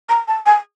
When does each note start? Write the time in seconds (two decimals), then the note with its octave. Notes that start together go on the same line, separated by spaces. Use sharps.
0.09 A#5
0.28 A5
0.46 G#5